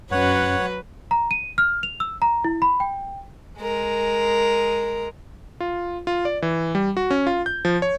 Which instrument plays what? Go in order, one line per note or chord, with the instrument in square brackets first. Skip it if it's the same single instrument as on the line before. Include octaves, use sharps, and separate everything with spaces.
[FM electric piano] F#2 C#4 [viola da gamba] F#3 B4 [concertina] C#5 F#5
[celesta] A#5
D#7
F6
F7
E6
A#5
E4
B5
G5
[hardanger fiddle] G#3 A#4
[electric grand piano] F4
F4
D5
E3
G3
F#4
C#4
F4
G6
F3
C#5